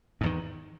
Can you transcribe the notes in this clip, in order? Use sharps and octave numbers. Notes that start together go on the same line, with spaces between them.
E2 G#2 D#3